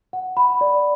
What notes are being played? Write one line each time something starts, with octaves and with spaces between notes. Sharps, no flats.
F#5
B5
D5